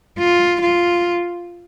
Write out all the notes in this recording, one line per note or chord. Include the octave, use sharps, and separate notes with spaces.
F4
F4